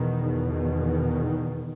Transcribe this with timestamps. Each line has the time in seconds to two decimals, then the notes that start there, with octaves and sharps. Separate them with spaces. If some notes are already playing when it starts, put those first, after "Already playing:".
Already playing: E2 B2 D#3
0.51 D#3